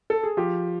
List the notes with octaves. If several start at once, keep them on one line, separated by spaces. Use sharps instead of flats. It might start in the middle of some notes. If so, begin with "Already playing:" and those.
A4
G#4
F3 G4